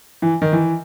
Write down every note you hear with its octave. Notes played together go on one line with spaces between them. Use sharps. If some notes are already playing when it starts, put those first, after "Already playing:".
E3
D#3
E3